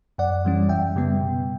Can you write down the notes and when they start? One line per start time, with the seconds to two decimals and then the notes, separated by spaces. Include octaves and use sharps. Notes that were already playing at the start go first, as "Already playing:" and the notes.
0.18 F#2 D5 F#5
0.45 E3 G3 C#4
0.69 F#2 E5 G5
0.96 C#3 G3 B3
1.21 B2